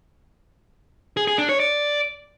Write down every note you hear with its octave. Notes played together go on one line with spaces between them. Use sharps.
G#4
G#4
D4
C#5
D5